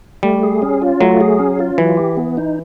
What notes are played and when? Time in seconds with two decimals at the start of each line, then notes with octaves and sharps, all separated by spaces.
0.23 G3 A3
0.43 G#4
0.62 C#4
0.82 F4
1.01 F#3 A3
1.21 G#4
1.39 C#4
1.59 F4
1.78 E3 F#3
1.97 G4
2.17 B3
2.37 D#4